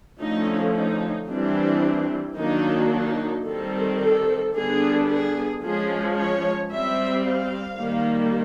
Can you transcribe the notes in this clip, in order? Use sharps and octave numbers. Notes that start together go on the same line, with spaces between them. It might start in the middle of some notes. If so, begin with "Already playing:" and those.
D3 F3 A3 C#4 D#4
D#4
E3 G3 C4 D4
D#3 F#3 A#3 D4 D#4
D#4
D#3 G3 C4 A4
A4
D3 G3 B3 D4 G#4
G#4
F3 G#3 C#4 G#4
C#5
G3 C4 E5
F5
D#3 G3 A#3